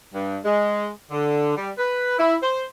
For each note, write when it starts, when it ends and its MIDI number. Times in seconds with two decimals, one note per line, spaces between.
0.14 0.38 43
0.45 0.88 56
1.11 1.53 50
1.56 1.70 55
1.78 2.18 71
2.19 2.35 64
2.43 2.64 72